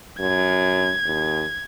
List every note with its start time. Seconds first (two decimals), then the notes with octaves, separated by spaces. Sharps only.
0.20 F#2 G#6
1.05 D#2